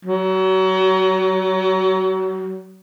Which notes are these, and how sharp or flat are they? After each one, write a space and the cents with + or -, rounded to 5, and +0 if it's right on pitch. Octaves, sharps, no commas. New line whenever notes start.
F#3 +30